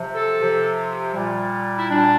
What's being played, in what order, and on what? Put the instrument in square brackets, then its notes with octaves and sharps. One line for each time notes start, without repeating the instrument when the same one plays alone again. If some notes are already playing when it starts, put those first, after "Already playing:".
Already playing: [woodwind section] C3 F3
A4
C3 F3
A#2 G3
E4
A#2 G3 D4